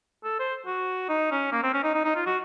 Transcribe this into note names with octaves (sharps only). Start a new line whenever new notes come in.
A4
C5
F#4
D#4
C#4
A#3
C4
C#4
D#4
D#4
D#4
F4
F#4